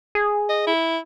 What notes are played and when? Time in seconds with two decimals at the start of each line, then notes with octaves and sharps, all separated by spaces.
0.15 G#4
0.49 D#5
0.67 E4